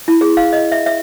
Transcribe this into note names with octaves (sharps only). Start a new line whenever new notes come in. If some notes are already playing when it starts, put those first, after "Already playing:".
E4
G#4
F5
D#5
E5
E5